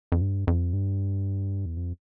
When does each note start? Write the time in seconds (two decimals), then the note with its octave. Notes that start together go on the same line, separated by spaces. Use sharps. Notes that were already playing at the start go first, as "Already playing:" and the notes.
0.12 F2
0.21 G2
0.47 F2
0.73 G2
1.66 E2
1.77 F2